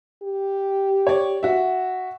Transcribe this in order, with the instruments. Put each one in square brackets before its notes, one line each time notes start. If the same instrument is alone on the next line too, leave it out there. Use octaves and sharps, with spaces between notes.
[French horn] G4
[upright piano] C#5 D5
F#4 E5